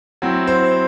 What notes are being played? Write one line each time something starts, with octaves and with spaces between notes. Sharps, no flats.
F#3 C4 E4
C5